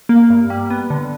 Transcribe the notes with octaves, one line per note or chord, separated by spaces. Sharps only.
A#3
G2
G3
B3
D3